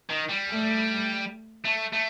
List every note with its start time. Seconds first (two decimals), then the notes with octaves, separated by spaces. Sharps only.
0.10 D#3
0.30 G3
0.49 A3
1.65 A3
1.93 A3